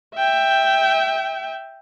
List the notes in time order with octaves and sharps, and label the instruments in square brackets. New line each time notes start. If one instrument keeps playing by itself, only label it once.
[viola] E5 G5